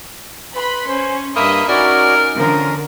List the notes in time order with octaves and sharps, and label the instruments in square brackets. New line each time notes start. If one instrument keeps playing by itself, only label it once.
[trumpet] B4 [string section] B5 C6
[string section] C#4 [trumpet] C5
[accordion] G2 D#6 [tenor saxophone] A#3 [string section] D#5 E5 [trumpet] B5
[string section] C#4 [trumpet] D#4 [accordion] F#4 D5 [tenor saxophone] A#4
[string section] D3 [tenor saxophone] F3 [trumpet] C#4 [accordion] A#4